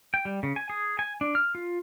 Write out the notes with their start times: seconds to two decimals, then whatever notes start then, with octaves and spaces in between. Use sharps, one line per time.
0.14 G5
0.25 G3
0.43 C#3
0.56 G#5
0.70 G#4
0.99 G#5
1.21 D4
1.35 F6
1.55 F4